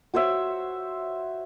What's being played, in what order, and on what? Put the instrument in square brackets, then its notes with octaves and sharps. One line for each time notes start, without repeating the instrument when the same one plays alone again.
[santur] F#4 C5 C#5 E5